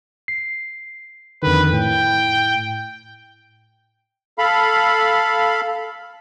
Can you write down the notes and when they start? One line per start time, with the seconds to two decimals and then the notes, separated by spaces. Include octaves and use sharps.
0.28 C7
1.43 F2 D3 D#3 B4
1.73 A2 G5
4.38 A4 F5 B5